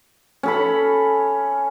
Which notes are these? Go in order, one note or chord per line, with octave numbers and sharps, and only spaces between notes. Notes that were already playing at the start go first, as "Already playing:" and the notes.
C#4 A4 B5